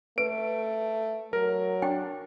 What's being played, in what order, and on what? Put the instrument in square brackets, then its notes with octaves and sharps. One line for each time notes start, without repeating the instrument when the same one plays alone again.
[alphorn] A3 [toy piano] B4 [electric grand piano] D7
[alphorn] F#3 [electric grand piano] A#4
[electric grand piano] D4 [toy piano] G5